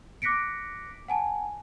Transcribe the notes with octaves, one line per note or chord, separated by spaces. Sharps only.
D6 F#6 A#6 B6 C#7 D7
F#5 G#5 A5